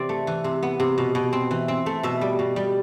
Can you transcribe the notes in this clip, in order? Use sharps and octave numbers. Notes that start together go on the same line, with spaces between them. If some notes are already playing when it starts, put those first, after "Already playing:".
Already playing: C3 E3 C4 D5
A3
E3
C3
B3
C3
B2
B2
C4
E3
C4
A3
B2 E5
G3
B2
G3